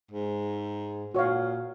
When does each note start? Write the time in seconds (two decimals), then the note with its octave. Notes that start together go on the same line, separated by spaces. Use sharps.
0.11 G#2
1.14 A#2 F#4 C#5 F5